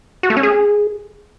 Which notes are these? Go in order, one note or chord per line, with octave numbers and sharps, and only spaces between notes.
F#4
A3
C#4
G#4